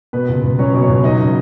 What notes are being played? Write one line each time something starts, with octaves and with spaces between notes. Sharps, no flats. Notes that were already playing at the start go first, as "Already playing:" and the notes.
B2 B3 B4
C#2
C#2
F#3 C#4 C#5
B2
C#4 C#5
C#2
F#3 D#4 D#5
F#3